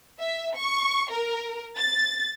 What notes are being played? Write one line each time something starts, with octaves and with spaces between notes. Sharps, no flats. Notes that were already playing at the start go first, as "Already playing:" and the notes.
E5
C#6
A#4
A6